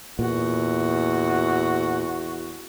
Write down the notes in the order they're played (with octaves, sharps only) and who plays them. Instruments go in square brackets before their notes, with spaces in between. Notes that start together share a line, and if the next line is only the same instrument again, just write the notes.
[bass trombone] E2 [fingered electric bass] A#2 [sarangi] F#4